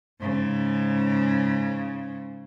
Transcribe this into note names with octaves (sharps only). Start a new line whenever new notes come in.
G#2 C#3